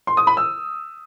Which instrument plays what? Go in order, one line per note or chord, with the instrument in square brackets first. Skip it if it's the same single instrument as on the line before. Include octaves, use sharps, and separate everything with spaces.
[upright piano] C6
D#6
B5
E6